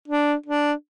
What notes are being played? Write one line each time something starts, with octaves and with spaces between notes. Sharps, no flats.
D4
D4